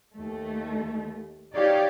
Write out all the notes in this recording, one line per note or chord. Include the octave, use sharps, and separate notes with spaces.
D#2 A3
D#4 G4 C#5 D5 F5